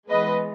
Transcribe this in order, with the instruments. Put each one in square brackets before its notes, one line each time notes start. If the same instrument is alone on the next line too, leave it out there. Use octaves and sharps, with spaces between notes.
[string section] E3 G#3 B3 B4 D#5